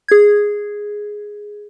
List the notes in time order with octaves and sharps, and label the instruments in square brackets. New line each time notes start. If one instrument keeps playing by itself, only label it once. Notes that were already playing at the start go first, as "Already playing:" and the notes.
[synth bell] G#4 G#6